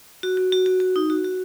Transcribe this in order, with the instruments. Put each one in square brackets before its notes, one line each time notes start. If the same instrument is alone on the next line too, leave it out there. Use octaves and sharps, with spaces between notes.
[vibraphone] F#4
F#4
F#4
F#4
F#4
D#4
F#4
F#4